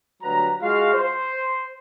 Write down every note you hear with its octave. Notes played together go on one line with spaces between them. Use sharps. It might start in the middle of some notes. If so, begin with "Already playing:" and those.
D2 F#3 G3 B4 A#5
G#3 F4 F#4 F5
C5